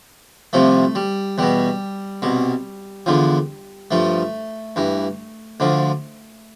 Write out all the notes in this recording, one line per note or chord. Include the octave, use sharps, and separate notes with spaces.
C2 C3 F3 A3
G3
E2 B2 G3
C2 B2
E2 D3 F3
G2 F3 A3
G2 E3
D2 D3 F3